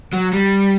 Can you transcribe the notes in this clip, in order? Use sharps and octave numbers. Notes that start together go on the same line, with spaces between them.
F#3
G3